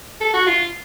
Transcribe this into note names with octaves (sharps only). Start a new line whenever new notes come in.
A4
F#4
F4